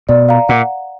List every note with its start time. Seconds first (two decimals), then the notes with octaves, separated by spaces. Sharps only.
0.09 B2 D5
0.29 F5 A#5
0.49 A#2 F#5